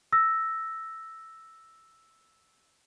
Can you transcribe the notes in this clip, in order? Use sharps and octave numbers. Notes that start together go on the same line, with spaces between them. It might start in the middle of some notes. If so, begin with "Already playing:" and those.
E6 A#6